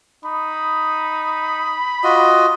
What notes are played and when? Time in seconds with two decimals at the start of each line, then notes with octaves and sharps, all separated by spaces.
0.25 D#4 B5
2.04 F4 F#4 D#5